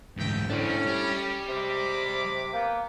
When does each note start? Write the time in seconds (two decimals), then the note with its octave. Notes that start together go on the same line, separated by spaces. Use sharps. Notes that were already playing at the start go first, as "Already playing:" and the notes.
0.17 D2 G#2 A3 D#4 G5
0.50 A2 C#4 D4 C5
0.86 G3
1.49 C3 G#3 B5 D6
2.53 A#3 B3 G5